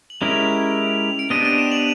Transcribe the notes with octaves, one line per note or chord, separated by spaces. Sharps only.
F#7
G#3 C#4 E4 G4 A#4 F7
D7
B3 D4 G4 C5 D#5 D#7
D#7
E7
F#7